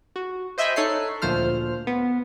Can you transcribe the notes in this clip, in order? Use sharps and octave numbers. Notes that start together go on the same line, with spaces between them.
F#4
C5 D#5 E5 G5 G#5 B5
D#4 A4 C#5 F#6 C7
D2 A#2 F3 C5 F6
B3